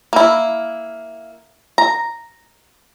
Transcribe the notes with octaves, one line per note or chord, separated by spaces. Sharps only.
A#3 E4
A#5